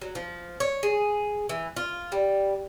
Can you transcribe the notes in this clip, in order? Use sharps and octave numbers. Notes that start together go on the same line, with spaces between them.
F#3
F3
C#5
G#4
E3
F4
G3